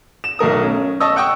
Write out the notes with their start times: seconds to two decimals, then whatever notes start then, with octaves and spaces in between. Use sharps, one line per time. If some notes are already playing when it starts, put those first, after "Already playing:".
0.24 E7
0.39 B1 A3 A#4 D#6
0.63 C#4
1.00 D#5 A5 C#6 D#6 E6
1.16 F#5 G5 C#6 D#6 E6